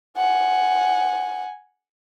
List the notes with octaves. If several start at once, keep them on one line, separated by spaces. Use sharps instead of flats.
F#5 G#5